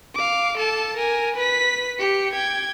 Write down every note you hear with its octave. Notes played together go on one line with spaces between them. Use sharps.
F5 D6
A4 A5
A#4 G#5
B4 B6
G4 C#7
G5 G#6